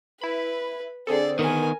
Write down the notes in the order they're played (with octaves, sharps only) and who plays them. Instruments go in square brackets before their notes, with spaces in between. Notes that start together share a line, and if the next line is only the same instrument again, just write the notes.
[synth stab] E4 B5 [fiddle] B4
[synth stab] D3 G#4 A4 [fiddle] C4 D5
[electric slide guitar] D#3 B3 [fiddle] A#4 G#5